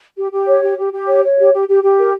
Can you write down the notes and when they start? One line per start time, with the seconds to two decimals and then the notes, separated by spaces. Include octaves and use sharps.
0.17 G4
0.32 G4
0.47 C#5
0.62 G4
0.78 G4
0.92 G4
1.08 C#5
1.23 C#5
1.39 G4
1.53 G4
1.68 G4
1.83 G4
1.99 A#4